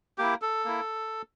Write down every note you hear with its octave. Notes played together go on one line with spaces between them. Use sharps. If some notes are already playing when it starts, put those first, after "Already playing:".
A#3 E4 G4
A4
A#3 E4